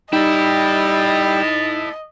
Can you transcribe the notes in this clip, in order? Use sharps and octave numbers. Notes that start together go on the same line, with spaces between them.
G3 D#4 E4 A4 D#5 G5